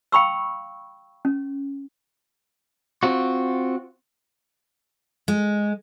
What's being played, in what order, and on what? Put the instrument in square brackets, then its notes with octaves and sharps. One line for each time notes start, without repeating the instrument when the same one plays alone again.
[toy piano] F5 G5 B5 C#6 E6
C#4
[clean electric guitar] C4 F4 F#4
[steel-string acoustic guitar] G#3